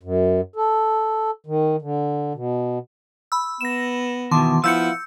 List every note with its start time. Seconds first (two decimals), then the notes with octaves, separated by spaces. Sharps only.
0.03 F#2
0.56 A4
1.46 D#3
1.82 D3
2.35 B2
3.32 B5 E6
3.61 B3 A#6 E7
4.31 E2 B2 D#3 A5 C6 D6
4.64 F3 B3 E4 F5 E6 G6 C#7